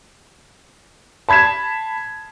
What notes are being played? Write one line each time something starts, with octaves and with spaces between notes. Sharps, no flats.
A5 B5 G#6 B6 E7